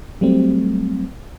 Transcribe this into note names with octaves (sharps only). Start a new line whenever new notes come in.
F#3 G3 A3 C4